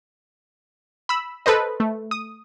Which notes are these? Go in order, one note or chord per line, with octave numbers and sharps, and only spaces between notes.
B5 E6
A4 B4 C5 D#5
A3
D#6